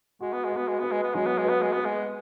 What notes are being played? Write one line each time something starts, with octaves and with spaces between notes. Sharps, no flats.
G#3 F#4
B3
G#3
F#4
B3
G#3
B3 B4
G#3
B3
F#3 G#3
B3
G#3
B3 B4
G#3
B3 B4
G#3